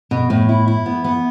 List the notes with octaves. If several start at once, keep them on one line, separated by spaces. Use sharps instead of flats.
B2
A2
E4
E4
B3
B3